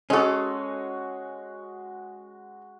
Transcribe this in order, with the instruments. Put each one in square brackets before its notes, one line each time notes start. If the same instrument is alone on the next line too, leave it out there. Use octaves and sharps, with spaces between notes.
[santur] G#3 F#4 [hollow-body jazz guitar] C#4 A4